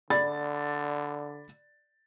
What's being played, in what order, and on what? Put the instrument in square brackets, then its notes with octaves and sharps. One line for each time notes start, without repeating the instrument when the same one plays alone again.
[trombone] D3 [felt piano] D5 B5 A6